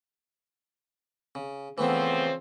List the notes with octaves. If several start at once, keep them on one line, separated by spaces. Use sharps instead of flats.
C#3
C#3 E3 F3 A3 B3 C4